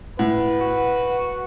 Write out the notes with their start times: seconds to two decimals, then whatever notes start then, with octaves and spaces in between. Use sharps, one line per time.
0.19 A2 B4 F#5
0.61 F#4